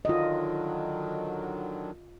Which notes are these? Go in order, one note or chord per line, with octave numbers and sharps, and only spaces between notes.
D3 D#3 F#3 F4 D#5